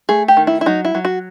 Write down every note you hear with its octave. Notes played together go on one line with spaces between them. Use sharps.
A3 G#4
G4
D#3
E4
E4
F#3 D#4
E4
F#3
F#4